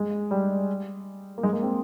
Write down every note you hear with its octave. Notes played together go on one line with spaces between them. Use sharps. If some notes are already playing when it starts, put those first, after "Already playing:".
Already playing: G#3
G3
A#3
G#3
A#3
C4